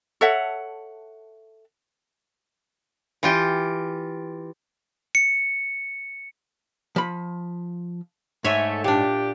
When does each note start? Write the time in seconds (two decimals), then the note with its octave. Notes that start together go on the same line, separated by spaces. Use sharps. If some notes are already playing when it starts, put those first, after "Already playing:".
0.21 A4 C#5 E5 F#5
3.23 E3 F4 G4
5.15 C#7
6.96 F3 B5
8.44 G#2 A3 C#5 E5 G#5
8.84 A#2 D4 G4